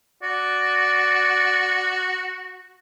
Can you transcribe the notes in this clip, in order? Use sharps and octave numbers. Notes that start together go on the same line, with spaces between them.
F#4 D5